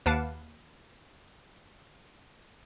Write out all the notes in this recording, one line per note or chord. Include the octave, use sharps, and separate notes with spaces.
D#2 B4 F5 F#5 A5 D6